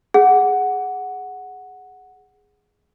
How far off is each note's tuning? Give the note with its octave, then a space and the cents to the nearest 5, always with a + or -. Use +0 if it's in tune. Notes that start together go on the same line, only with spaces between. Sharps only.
G#4 +0 F#5 +0